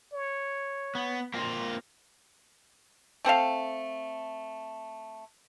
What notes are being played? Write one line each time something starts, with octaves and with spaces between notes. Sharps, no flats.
C#5
B3
A#3 C4 F4
A3 C4 A4 F5